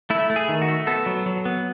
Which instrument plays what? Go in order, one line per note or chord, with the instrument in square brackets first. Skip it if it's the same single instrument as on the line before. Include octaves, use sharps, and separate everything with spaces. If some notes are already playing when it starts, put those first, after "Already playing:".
[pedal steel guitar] A3 E4
A3
G#4
D#3
F#4
A3
B3 A4
F#3
F#3
B3